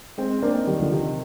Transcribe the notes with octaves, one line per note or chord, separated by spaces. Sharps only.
G#3 C4
A#3 D4
C4 D#4
D#3 G3
D3 F3
C3 D#3